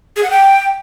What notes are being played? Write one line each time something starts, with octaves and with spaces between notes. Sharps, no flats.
G#4
F#5
G5